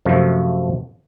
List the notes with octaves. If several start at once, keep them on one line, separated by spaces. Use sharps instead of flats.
F#2 C3 F3 A3